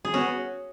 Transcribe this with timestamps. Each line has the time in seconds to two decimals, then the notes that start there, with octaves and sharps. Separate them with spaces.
0.05 G#4
0.14 B3 C#4 F#4